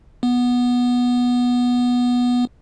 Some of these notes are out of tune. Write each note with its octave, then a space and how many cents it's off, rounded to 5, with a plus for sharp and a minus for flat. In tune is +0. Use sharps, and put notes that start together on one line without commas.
B3 -10